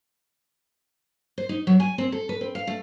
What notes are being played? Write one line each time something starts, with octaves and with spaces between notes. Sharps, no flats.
C5
D#4
F#3
G#5
C4
A4
B4
C4
F5
A3